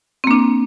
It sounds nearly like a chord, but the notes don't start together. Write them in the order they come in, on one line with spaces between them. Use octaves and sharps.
C4 A#3 D4